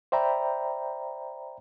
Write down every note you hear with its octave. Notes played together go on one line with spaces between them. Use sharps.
C5 D5 E5 G5 A#5 B5